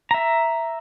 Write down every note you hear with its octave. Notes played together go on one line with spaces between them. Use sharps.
E5 A#5